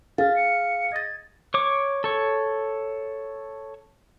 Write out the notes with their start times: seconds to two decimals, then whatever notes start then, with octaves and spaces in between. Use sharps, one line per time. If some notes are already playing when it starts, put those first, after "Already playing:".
0.18 G#4 F5 F6 A6
0.36 C#7
0.92 D#5 G#6 A6
1.54 C#5 D6
2.04 A4 C#5